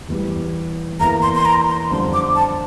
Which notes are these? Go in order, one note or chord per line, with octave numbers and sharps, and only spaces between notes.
E2 E3 G3
E2 E3 A#3 E4 A#5
C6
C6
A#5
C6
F2 D3 G3 D4 C6
D6
A5